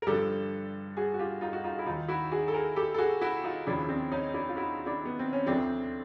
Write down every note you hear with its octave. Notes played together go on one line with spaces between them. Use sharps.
A#4
G2 D3 F3 G4 A4
F#4 G#4
F#4
F4 G4
D#4 F4
F#4
D#4 F4
E4
D#2 D#3 D#4 F4
E4 F#4
F#4 G#4
A4
G#4 A#4
G4 A4
A4
F#4 G#4
E4 F#4
D#4 F4
D#2 C#3 F3 D4 E4
C4 D4
C#4 D#4
D4 E4
F4
E4 F#4
D4 E4
B3
C4
C#4
D2 D3 F3 C4 D4